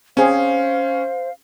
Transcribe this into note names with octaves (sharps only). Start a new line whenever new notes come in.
C4 C#4 G#4 C5 F5